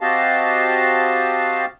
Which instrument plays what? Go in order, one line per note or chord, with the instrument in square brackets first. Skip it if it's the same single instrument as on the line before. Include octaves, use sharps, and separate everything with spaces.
[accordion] C4 F#4 G4 D#5 F5 A5